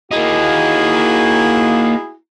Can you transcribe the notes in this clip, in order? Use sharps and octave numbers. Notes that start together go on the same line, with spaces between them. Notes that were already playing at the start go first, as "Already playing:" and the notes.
A#3 D#4 E4 F#4 G#4